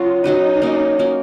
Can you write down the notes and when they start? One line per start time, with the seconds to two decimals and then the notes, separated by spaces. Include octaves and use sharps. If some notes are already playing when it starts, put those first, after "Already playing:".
Already playing: F#3 C#4 F4 F#4
0.24 F#3 C#4 D#4 F#4 B4
0.62 A#3 C#4 F#4
0.99 A#3 C#4 F#4